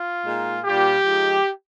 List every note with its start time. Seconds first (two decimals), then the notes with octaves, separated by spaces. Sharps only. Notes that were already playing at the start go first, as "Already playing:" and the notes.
Already playing: F4
0.25 A#2 G#3 D#4
0.64 A#2 G3 D4 F4 G4
1.04 F3 G#3 D#4